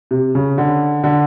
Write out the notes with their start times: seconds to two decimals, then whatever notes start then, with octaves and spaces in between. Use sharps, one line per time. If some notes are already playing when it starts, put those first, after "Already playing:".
0.11 C3
0.35 C#3
0.58 D3
1.04 D3